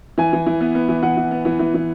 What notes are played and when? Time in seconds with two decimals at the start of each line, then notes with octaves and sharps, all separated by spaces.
0.18 E3 G#5
0.33 E3
0.47 E3
0.61 B3
0.75 B3
0.89 E3
1.03 E3 F#5
1.17 E3
1.31 B3
1.45 E3
1.59 E3
1.74 E3